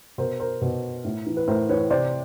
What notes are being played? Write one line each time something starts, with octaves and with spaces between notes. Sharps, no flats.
B2 A#4 C5
A#4 C5
B2
A2
E3
B4
A2 A#4 C5
E3 B4 C#5
C3 C5 D5